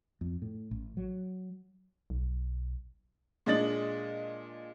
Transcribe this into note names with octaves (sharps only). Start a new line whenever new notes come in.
F2
A2
A1
F#3
B1
A#2 G#3 D4 D#5 A6 F#7